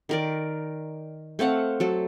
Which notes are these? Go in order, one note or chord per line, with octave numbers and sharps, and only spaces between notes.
D#3 A#4 D5
A3 C4 F5 F#5
F#3 A4